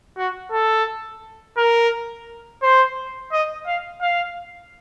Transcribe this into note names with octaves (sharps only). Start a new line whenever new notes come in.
F#4
A4
A#4
C5
D#5
F5
F5